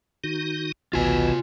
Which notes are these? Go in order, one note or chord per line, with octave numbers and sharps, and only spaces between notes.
D#3 D#4 F#4
A1 D2 B2 E3 F4 G#5